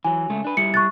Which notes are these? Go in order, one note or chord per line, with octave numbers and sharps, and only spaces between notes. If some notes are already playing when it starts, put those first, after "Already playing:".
E3 F#3 G#5
C#3 G#3 A3
D4 B4
G3 E4 G#4 C#7
C#6 F#6 A6